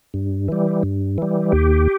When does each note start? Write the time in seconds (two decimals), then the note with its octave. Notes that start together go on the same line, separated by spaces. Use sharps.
0.14 G2
0.48 E3 G3
0.83 G2
1.18 E3 G3
1.52 D#2 G4